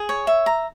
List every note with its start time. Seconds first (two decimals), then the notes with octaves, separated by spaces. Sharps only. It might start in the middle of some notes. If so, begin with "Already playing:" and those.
Already playing: G#4
0.09 C#5
0.27 E5
0.46 A#5